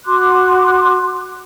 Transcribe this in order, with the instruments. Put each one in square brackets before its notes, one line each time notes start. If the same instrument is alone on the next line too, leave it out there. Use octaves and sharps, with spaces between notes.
[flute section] F#4 C6 D6 F#6